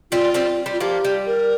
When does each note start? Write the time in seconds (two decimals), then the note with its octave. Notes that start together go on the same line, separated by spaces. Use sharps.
0.11 G3 C4 F4
0.34 G3 C4
0.66 G3
0.72 F4
0.80 F3 A#3 G4
1.05 G3
1.27 A#4